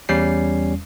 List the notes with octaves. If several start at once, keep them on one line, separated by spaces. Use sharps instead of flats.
E2 G3 C#4 C7